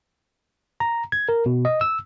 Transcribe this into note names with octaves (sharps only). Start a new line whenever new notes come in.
A#5
G#6
A#4
B2
D#5
E6